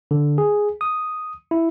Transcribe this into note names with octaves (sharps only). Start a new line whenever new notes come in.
D3
G#4
D#6
E4